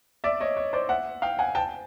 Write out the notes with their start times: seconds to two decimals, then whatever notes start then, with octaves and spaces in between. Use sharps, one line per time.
0.24 D5 E5
0.40 C#5 D#5
0.57 C#5
0.73 C5 D5
0.89 E5 F#5
1.22 F5 G5
1.39 F#5 G#5
1.55 G5 A5